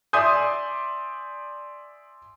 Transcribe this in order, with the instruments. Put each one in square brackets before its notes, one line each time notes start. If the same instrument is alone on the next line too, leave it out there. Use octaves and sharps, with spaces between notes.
[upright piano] D5 E5 G#5 C6 D#6 G6